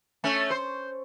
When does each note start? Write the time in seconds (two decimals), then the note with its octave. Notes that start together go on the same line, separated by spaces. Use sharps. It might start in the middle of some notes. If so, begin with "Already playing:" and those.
0.24 A3 C#4
0.50 C5